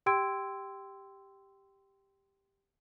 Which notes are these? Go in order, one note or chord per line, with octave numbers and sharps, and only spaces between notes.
G4 G5 C6 E6 G#6 D7